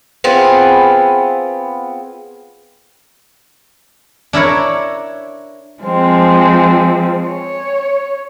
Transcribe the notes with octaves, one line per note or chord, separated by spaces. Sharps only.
B3 C4 F4 G#4
D4 E4 A#4 C#5
F3 G#3 C4
C#5